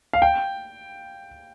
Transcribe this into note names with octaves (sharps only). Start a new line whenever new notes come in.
F5
G5